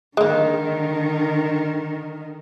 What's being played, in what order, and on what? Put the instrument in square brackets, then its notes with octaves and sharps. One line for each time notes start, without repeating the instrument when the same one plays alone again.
[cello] D3 D#3 [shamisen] G#3 A#3